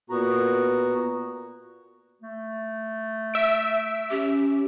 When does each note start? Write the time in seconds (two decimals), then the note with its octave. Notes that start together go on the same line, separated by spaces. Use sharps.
0.10 A#2 B3 F#4 A#5
2.22 A3
3.34 E5 D7
4.11 C#4 G4